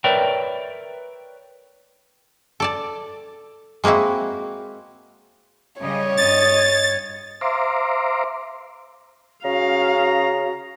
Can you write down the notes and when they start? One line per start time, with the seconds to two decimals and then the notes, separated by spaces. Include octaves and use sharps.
0.04 A#4 B4 C#5 D5 E5 G5
2.60 A4 D5 A5
3.84 G#3 A#3 C4 E4 F#4
5.81 C#3 G3 C#5 D#5
6.17 G2 D#5 A6
7.41 C5 E5 F5 A#5 C6 D6
9.45 C#3 C#4 F#4 F5 A#5